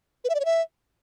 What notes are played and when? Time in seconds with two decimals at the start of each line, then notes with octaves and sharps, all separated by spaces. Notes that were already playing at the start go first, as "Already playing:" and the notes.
0.24 B4
0.30 E5
0.35 D5
0.40 C#5
0.45 E5